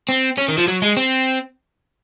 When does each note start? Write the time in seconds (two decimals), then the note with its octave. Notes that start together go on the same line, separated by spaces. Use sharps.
0.09 C4
0.38 C#4
0.48 D#3
0.58 F3
0.68 F#3
0.82 G#3
0.97 C4